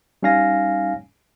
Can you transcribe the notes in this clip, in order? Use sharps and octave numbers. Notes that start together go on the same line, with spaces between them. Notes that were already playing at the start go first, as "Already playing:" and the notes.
G3 C#4 D#4 F5 G#5 A#6